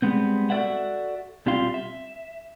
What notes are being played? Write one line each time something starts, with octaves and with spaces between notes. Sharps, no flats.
G3 G#3 B3 C4
F#4 A4 A#4 D5 E5 F#5
B1 G3 C4 F4 F5 C6
E5